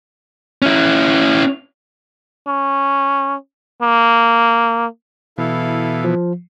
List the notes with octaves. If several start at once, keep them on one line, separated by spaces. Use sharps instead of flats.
C#4 E4
C#4
A#3
B2 E3 E4 A4 F5
F3